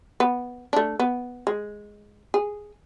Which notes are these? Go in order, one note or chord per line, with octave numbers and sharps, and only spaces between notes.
B3
A3 D4
B3
G#3
G#4